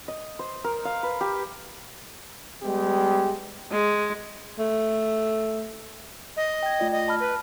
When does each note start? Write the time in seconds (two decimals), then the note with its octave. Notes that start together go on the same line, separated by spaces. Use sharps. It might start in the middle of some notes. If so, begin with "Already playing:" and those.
0.08 D#5
0.39 C5
0.64 A#4
0.85 F5
1.03 B4
1.21 G4
2.64 G3 G#3 B3 G4
3.71 G#3
4.59 A3
6.37 D#5
6.63 G5 G#6
6.80 A3 F4 D5
6.92 D#5
7.08 A5 B5 F6
7.20 B4